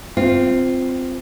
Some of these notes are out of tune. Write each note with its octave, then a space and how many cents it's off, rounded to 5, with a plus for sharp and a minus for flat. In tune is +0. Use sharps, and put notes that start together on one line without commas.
C4 -10 F4 +0